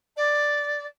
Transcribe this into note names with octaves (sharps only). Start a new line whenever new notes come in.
D5